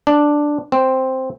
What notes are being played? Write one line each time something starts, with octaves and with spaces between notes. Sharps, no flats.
D4
C4